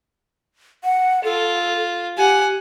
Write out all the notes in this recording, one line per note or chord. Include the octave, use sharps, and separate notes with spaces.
F#5
F4 A4
G4 F#5 G#5